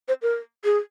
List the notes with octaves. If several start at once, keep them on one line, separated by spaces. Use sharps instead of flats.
C5
A#4
G#4